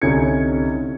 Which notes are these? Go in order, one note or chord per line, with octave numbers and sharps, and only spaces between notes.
C2 D3 C#4 D#4 G#6 C#7